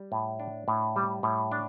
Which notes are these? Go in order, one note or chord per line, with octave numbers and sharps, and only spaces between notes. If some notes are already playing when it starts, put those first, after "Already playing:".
Already playing: G3
A2
D4
A2
G3
A2
D4